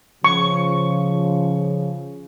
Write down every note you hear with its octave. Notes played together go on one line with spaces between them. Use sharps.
C#3 F3 C#6